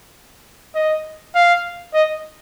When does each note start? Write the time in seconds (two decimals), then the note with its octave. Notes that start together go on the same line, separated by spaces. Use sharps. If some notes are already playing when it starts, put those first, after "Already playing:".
0.75 D#5
1.35 F5
1.94 D#5